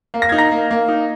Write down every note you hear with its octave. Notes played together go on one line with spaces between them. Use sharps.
A#3
A#6
D#4 G#6
A#5 A#6
A#3
A#3
D#4